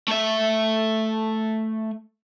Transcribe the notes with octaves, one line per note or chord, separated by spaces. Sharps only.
A3 E5